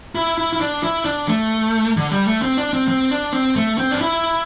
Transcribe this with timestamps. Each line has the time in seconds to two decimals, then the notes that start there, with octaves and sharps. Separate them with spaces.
0.15 E4
0.38 E4
0.53 E4
0.61 D4
0.83 E4
1.05 D4
1.28 A3
1.97 D3
2.11 G3
2.27 A3
2.42 C4
2.58 D4
2.73 C4
2.88 C4
3.11 D4
3.33 C4
3.56 A3
3.78 C4
3.91 D4
4.01 E4